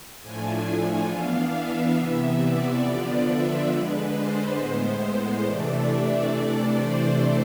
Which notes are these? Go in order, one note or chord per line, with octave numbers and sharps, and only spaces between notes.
A2 F3 A3 D4 G#5
E3 B3 D4 F5
E5
C3 E3 B3
D5
D3 F3 B3 D4
E5
D3 G#3 D4 B4
C5
A2 G#3 B3
C3 E3 A3 D4 D5
E5
C3 E3 A3 D4 D5
C5